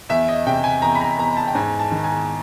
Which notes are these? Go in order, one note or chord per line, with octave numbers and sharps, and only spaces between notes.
E2 E5
D#5
C3 G5
G#5
E2 A#5
B5
A#5
E2 A#5
A5
G5
G#2 G#5
A5
D#3
G#5